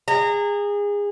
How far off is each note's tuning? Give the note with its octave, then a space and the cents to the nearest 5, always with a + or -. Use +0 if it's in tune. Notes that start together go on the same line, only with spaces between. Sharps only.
G#4 -25 A#5 -25